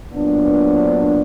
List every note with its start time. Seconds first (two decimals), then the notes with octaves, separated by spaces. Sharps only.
0.12 A#2 F#3 B3 D4
0.40 B4
0.68 C5